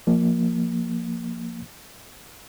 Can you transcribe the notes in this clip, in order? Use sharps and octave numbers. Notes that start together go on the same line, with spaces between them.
F3 A#3